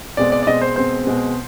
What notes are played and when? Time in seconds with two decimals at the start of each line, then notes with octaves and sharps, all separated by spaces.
0.17 B2 G#3 C4 D5
0.32 D5
0.43 D5
0.47 B2 G#3 C4 D#5
0.61 C5
0.76 B2 G#3 C4 C5
1.05 B2 G#3 C4